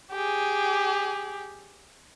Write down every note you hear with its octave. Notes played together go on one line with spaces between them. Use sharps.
G4 G#4